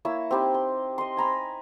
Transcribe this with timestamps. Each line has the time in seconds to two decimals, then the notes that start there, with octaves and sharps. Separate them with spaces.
0.05 A#3 E4 C#5 E6
0.31 C4 D#4 G4 B5
0.54 C6
0.98 D#5 C6
1.17 G#5 A#5 B5